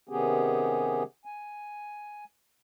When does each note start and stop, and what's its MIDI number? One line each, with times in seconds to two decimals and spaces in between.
0.09 1.03 48
0.09 1.03 51
0.09 1.03 59
0.09 1.03 61
0.09 1.03 67
0.09 1.03 68
1.25 2.24 80